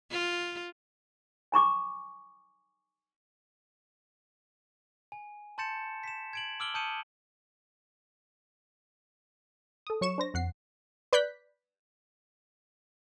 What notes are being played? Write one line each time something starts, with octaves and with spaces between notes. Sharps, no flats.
F4
G#5 A#5 C#6 D6
G#5
A5 C6 G6 A6 C#7 E7
B6 E7
G#6 D7 F#7
D6 E6 F6 D7 F#7 G7
A5 D#6 G6 C#7 D#7 E7
A4 D#6
F#3 C#5 C#6 C#7 E7
D4 C5 A#6
F2 F#5 C7
B4 D5 F#6 G6 B6